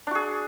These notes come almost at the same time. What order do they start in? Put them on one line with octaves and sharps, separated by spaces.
D4 F#4 G#4